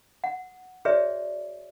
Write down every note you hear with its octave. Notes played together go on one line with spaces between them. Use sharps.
F#5
F#4 G#4 B4 C#5 D5 E5